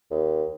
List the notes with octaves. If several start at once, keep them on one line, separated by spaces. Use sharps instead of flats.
D#2